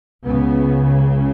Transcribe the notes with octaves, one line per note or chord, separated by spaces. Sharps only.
C#2 C#3 B3